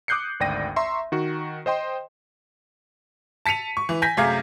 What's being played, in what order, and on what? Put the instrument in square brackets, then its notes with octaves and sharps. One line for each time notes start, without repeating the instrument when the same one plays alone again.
[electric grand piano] D6 D#6 F#6 G6 C7 C#7
G#1 D2 D5 G5 A#6 D#7
E5 A#5 C6 C#6
D#3 F#4
C5 D#5 G5 C6
[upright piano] A5 B6 C#7 D#7 F7
C#6
E3
G#5 G6 A#6 B6
F#2 C3 A3 G#4 F5 G#6